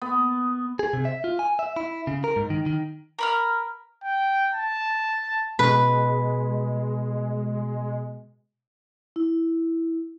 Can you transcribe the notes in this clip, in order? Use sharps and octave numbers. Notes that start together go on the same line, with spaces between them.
B3
G#4
C3
E5
F4
G#5
E5
E4
C#3
A#4
G#2
D#3
D#3
A#4 B5 F6
G5
A5
B2 G#3 B4
E4